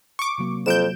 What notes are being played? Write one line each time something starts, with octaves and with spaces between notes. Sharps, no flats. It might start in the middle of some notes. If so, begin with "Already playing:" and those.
C#6 D6
C3 F#3 A#3
F2 F#3 G6 D7 E7